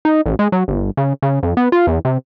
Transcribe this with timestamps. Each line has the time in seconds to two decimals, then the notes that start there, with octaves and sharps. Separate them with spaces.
0.05 D#4
0.26 A1
0.39 G#3
0.52 F#3
0.68 G1
0.97 C#3
1.22 C#3
1.43 F2
1.57 B3
1.72 F4
1.87 E2
2.05 C3